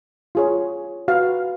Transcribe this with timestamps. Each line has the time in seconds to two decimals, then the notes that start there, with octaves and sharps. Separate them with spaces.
0.35 F4 G#4 C#5
1.08 F#4 B4 F5